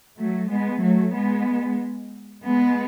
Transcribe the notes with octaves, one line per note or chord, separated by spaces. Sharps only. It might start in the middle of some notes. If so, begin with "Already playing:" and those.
F#3 A3
G#3 B3
F#3 A3
G#3 B3
G#3 B3